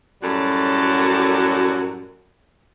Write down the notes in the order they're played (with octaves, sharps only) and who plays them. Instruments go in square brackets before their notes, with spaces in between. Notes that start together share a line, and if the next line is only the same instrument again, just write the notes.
[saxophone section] F#2 A2 G3 F#4 A4